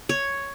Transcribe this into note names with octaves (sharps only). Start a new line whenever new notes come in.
C#5